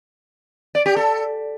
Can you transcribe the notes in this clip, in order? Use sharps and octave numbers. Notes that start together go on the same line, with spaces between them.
D5
G4
A4